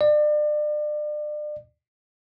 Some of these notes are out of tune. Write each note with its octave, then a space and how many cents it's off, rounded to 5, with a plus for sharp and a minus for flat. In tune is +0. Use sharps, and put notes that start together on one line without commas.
D5 +35